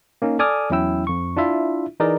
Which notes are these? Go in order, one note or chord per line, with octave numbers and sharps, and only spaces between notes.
A#3 C#4 D#4
A4 D5 G#5 D6 D#6 F6
E2 F#3 C#4 E4 G5 E6
F2 C#6
D4 E4 F4 E5
E3 D#4 G#4 A#4 D5